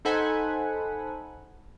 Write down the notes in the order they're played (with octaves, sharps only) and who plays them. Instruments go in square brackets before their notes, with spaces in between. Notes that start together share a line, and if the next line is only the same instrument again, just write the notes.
[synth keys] D#4 A4 C5 F#5 G#5 B5